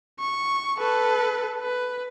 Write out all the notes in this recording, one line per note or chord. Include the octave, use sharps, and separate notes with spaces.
C#6
A4 B4
B4